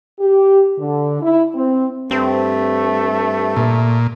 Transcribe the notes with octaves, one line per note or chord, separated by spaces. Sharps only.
G4
D3
E4
C4
G2 A3 C4
A#2